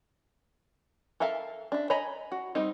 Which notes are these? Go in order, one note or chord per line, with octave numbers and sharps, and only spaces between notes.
A4 A#4 E5 F5 A5
D4 E5
C#5 D#5 G#5 A#5 B5
F#4
G3 C4 D#4